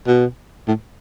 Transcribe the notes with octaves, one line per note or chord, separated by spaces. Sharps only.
B2
A2